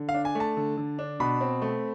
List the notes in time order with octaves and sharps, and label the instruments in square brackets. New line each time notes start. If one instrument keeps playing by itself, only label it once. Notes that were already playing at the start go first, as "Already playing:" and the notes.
Already playing: [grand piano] D3
F5
D4
G#5
A3
A5
D3
D3
D4
B2 B5
C4
A3